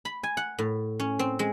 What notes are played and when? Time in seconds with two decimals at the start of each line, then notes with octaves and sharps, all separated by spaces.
0.05 B5
0.23 G#5
0.37 F#5
0.59 A2
1.00 C#4
1.19 C4
1.39 G#3